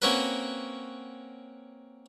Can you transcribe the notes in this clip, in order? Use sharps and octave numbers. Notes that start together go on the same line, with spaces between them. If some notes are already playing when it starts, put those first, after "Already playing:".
A#3 C4 C#4 F#4 A#4 B4